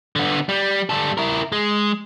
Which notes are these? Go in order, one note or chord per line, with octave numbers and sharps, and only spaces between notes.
D3 B3
G3
G3 A4
E4 A#4
G#3